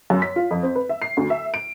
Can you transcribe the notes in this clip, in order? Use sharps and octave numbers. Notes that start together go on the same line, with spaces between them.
F#2
B6
F4
F2
C4
B4
E5
C7
D2
E5
D7